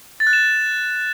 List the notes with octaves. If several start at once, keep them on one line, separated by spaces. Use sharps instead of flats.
A6
F#6
E7